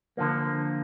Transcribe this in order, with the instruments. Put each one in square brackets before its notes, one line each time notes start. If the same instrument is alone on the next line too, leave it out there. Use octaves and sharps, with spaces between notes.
[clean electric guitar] D3 F3 A#3